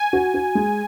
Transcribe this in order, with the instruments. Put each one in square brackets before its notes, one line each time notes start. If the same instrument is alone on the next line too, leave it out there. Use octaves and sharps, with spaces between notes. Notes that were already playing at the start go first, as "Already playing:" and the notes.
Already playing: [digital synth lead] G#5
[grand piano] F#4
F#4
G#3